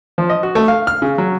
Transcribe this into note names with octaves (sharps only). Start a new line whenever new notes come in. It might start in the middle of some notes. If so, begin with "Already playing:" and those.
F3
D#5
F#4
A3
F5
F6
C#3
F#3